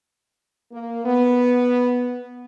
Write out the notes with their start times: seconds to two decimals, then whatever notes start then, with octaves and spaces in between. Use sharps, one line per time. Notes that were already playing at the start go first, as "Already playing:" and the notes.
0.72 A#3
1.05 B3